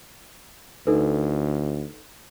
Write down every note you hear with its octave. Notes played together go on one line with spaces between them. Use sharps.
D2 D#4 A4 B4